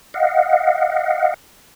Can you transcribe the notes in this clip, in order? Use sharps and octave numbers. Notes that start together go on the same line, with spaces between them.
D#5 F5 F#5